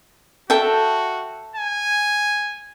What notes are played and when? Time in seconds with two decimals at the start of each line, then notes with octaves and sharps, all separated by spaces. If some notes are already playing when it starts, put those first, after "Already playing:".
0.50 F#4 A4 E5 G5
1.56 G#5